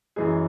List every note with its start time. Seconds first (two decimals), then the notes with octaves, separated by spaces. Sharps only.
0.16 F#2 E3 G#3 G#4